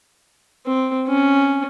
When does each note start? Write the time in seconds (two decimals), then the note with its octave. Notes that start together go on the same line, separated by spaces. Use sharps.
0.66 C4
1.07 C#4